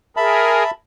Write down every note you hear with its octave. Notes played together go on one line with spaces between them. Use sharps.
G#4 A#4 E5 A5 B5